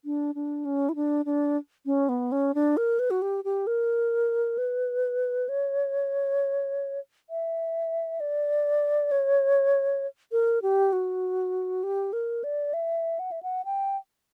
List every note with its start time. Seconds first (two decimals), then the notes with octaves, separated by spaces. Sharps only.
0.05 D4
0.35 D4
0.65 C#4
0.89 E4
0.95 D4
1.25 D4
1.86 C#4
2.09 B3
2.32 C#4
2.55 D4
2.77 A#4
2.99 B4
3.11 F#4
3.22 G4
3.44 G4
3.67 A#4
4.58 B4
5.49 C#5
7.30 E5
8.20 D5
9.11 C#5
10.32 A#4
10.62 G4
10.93 F#4
11.83 G4
12.13 A#4
12.44 D5
12.74 E5
13.19 F#5
13.32 E5
13.43 F#5
13.65 G5